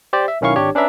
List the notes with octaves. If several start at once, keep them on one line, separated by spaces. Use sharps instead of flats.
G4 C5 D5
E5
B1 D#3 C#4 E4 F5 C#6
G#1 D4 G4 C#5
C#4 D4 B4 E5 A#5